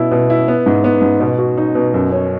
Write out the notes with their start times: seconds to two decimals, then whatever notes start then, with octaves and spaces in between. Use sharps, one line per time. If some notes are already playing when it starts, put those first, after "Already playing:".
Already playing: B2 B3 E4
0.11 B2
0.30 E4
0.48 B3
0.66 G#2
0.84 B3
1.02 G#2
1.20 B2
1.38 F#4
1.58 D#4
1.75 B2
1.94 F#2
2.12 C#4